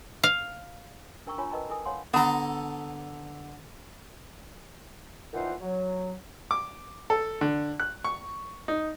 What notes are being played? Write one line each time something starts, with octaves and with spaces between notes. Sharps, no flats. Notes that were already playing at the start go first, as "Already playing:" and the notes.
F5
D4 A#4 G5 A#5 C#6 E6
D4 F4 C#5 G#5 A#5 B5
A#4 B4 D#5 G5 A5 A#5
E4 A4 A#4 G#5 D#6
C#5 F5 F#5 G#5 B5 C6
D3 B3 A4 A#5
A#2 D#3 E3 F4 C5 F#5
F#3
D6
A4
D3
F#6
C#6
D#4